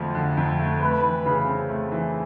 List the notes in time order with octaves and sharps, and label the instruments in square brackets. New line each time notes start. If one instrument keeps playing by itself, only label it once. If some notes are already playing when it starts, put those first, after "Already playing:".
Already playing: [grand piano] F2 D3 F3 A3
D3
F2
A3
[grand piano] A3 [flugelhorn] B4
[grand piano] E3
C#3
C4
A3
E3